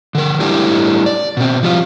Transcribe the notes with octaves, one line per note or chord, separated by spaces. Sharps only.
D3 A#4
G3 A3 D4 E4 G4
D5
B2 C4
F3 G3 F4